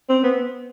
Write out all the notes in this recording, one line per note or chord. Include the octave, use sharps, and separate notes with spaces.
C4
B3